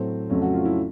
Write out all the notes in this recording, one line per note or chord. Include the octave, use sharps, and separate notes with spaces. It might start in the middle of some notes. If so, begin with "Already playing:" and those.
Already playing: A2 F#3 A3 C4
F2 C#3 F#3 A3 C#4
F#4
F4
E4